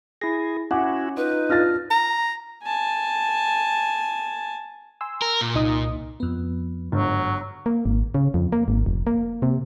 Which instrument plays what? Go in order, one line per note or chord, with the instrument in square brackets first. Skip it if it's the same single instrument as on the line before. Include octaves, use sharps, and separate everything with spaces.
[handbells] E4 A#6 [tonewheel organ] G#4
[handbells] C#4 [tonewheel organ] E4 F#4 [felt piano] F#5 D6
[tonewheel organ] D#4 [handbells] F4 [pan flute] B4
[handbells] D4 F6 A#6 [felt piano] F4 A6
[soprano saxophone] A#5
[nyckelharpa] G#5 A5
[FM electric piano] G#5 C6 E6
[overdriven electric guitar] A#4
A#2
[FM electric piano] C2 D#4 D#6
F2 B3
[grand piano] G1 [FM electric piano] G#2 [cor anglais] F#3
[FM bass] A#3
G#1
C#3
F2
A#3
G#1
F1
A#3
C3